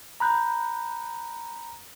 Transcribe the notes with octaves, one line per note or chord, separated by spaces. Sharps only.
A#5 B5 F#6 G6